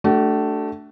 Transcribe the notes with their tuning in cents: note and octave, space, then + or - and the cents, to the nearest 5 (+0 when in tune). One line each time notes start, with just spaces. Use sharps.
A3 +0 D4 +0 F#4 +45